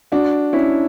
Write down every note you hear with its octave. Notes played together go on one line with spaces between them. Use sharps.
D4 F#4
C#4 E4